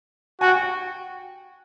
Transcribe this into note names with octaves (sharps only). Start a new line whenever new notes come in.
F#4 G#5
G5
F#5
G5